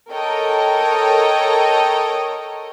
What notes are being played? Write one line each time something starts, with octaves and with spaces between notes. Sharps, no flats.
A4 A#4 C#5 D#5 G5 A#5